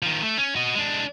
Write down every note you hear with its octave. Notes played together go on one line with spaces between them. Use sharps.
D#3 F3
A3
C#4
F#4 D#5
G#3 D4